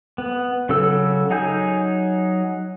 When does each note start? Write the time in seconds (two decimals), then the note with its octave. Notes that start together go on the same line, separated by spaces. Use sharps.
0.18 B3
0.69 C#3 F#3 A4 E6
1.30 F#3 D#4 G#4 G#5 G6